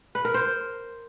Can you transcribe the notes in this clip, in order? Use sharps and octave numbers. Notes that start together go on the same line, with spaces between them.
B4
A#4
C5